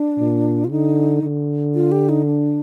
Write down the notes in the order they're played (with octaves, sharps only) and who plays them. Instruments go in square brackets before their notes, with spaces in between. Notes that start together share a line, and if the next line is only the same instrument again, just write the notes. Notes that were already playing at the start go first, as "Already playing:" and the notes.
Already playing: [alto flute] D4
[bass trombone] A#2
[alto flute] F4
[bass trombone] D3 [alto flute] D#4
[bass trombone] D3
[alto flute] F4
G4
D#4
D4